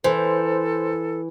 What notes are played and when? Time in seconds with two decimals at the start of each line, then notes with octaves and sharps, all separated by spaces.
0.04 E3 A4 C5